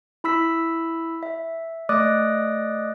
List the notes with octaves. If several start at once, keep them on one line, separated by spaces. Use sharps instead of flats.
E4 B5 E6 B6
E5
A3 D5 D#5 D6 D#6 F#6